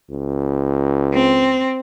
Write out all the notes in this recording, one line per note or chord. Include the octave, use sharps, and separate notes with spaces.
C#2
C4